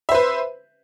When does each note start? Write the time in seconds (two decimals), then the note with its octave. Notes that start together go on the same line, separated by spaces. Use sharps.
0.09 E5
0.12 C5
0.14 B4